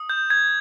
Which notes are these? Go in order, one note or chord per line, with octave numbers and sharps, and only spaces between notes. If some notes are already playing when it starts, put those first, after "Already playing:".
Already playing: D#6
G6
G#6